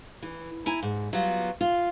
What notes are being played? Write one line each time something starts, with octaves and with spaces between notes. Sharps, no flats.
E3
E4 G#5 A#5
G#2
F#3 G3 B3 F4
F4